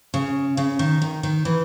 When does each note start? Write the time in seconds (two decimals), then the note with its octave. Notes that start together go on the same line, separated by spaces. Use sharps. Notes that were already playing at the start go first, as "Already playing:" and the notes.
0.14 C#3
0.57 C#3
0.79 D#3
1.02 D#3
1.23 D#3
1.45 E3